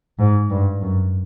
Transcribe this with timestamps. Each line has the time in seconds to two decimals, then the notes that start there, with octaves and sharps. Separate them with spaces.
0.19 G#2
0.50 G2
0.81 F#2